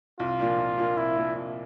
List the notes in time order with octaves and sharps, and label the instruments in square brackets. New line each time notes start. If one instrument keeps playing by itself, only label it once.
[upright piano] C2 [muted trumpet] F4
[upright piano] A#2 F3 A#3 D4
C2
A#2 F3 A#3 D4
[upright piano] C2 [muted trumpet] E4
[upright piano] A#2 F3 A#3 D4
C2